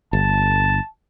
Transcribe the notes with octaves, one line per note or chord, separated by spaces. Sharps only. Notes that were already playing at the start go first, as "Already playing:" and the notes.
G1 A5